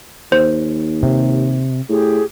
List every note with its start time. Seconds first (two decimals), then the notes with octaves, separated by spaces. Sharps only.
0.32 D#2 C5
1.03 C3
1.90 A2 G4 G#4